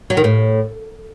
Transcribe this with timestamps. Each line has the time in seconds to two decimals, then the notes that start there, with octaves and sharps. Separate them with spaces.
0.10 F#3
0.17 D#3
0.24 A2